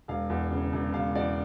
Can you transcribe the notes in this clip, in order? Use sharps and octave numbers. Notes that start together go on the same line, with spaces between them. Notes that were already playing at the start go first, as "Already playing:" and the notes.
E1 F5
E2
C#3
E1
E1 F5
E2 D5